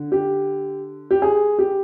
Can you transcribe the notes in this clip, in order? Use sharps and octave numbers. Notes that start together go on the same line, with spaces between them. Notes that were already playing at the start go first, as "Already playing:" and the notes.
Already playing: D3
G4
G4
G#4
G4